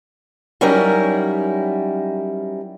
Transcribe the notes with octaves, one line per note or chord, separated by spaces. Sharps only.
F#3 G3 C#4 D#4 E4 A#4